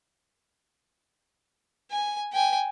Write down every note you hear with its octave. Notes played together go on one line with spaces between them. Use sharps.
G#5
G5 G#5